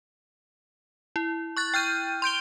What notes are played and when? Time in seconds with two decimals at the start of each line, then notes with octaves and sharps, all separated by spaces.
1.16 E4
1.57 C#6 F#6 A6
1.74 G5 F6 G6 D#7
2.22 C6 G6 D7 G7